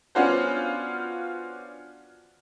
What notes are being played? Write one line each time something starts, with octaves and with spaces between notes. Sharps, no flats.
B3 C#4 D4 F4 F#4 C5